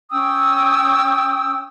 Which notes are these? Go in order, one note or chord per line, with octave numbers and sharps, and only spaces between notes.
C#4 G5 D#6 E6